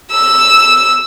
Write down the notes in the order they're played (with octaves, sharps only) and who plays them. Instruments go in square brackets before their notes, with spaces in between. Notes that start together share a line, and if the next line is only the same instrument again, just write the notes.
[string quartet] E6